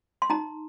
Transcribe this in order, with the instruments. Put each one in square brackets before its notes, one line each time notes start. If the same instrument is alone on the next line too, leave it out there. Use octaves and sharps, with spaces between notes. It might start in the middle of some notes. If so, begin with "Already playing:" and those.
[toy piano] C6
D#4 A#5